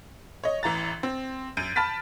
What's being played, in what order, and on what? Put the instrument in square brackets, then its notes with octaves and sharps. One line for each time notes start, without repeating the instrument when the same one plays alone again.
[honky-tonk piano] C#5 D#5
A1 E3 A#5 A6
C4
F#2 G6 D7 D#7
A5 B5 F6 A6 B6